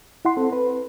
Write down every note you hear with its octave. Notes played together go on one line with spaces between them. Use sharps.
E4 F#5 C6
C4 A4
B4